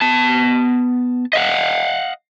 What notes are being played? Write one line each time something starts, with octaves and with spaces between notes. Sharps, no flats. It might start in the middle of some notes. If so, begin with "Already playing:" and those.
B3 A5
D#5 F5 F#5